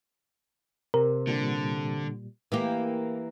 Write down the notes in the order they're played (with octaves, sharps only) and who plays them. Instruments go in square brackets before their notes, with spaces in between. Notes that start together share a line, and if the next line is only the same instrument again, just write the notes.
[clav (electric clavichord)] C3 [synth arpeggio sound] A#4
[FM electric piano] A#2 G3 [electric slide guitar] D3
[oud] E3 A#3 G4